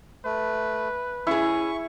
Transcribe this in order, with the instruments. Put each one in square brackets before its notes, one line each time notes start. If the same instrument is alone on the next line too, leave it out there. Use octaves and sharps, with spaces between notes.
[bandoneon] A3 [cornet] B4
[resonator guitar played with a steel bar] C#4 G#4 [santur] E4 [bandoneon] C#6